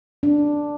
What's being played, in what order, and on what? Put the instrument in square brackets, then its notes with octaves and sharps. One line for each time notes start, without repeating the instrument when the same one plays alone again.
[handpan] D4